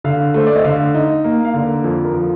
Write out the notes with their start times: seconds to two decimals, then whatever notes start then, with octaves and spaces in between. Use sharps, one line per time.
0.04 D3 F5
0.34 A3 C5
0.47 D5
0.56 D#5
0.64 D3 F5
0.95 D#4
1.24 A#3
1.45 F5
1.54 D3
1.64 A#4
1.84 F2 A4
2.05 A#4
2.14 F3